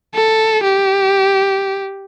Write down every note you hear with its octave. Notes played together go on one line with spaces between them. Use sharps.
A4
G4